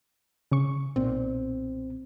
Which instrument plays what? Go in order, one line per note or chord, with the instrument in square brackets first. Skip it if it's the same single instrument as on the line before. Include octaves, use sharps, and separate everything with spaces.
[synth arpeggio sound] C#3 C#6
[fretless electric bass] B1 A#2 [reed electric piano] C4